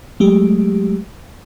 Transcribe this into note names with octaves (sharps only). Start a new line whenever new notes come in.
F#3 G#3 A3 G4